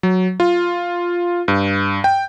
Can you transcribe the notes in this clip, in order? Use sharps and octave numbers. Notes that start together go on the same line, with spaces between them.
F#3
F4
G2
G5